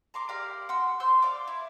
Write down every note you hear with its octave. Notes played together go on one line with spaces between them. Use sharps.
A#5 C6 D6
G4 A#4 D5 F5
F#5 C6 E6
C5 C6 E6 G6
D5 F5 D6
E4